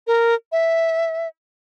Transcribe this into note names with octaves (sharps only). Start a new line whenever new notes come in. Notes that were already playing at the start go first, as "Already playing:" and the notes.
A#4
E5